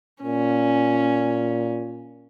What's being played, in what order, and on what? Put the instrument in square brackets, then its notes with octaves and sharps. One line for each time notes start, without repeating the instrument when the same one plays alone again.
[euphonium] A#2 [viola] C#4